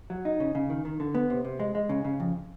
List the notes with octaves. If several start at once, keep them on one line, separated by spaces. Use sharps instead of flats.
F#3
D#4
C#3
C#3
D#3
D#3
D3
B3
C3
C3
G#3
G#3
C#3
C#3
F2